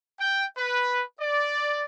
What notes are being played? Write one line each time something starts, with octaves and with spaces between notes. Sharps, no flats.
G5
B4
D5